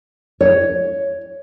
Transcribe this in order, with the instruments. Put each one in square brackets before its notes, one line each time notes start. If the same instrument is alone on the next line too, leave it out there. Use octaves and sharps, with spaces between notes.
[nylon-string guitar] C#5